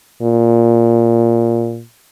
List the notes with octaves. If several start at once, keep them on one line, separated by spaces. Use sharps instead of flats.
A#2